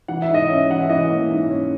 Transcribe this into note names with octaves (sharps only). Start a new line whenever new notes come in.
E3 F#5
E5
G#2
D#5
C#4 E5
E3 F#5
E5
E3 D#5
A#3
G#2
C#4